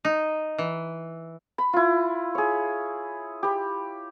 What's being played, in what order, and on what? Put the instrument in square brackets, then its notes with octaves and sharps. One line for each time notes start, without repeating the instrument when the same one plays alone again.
[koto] D#4
E3
[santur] B5
E4 F4
G#4 C#5
G4 B5